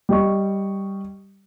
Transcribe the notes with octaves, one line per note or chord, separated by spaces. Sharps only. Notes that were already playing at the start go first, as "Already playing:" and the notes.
G3 G4 D#5 C#6